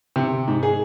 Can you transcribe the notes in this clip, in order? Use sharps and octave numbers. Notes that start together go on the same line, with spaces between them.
C3
G#2
G#4